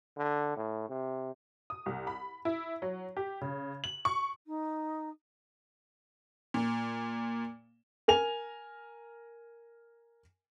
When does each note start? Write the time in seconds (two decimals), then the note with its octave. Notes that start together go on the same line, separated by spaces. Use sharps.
0.17 D3
0.56 A2
0.89 C3
1.70 D#6
1.86 C2
2.07 B5
2.45 E4
2.82 F#3
3.17 G4
3.41 C#3
3.84 F#7
4.05 C#6
4.46 D#4
6.54 A#2
8.08 A#4 G#5 F7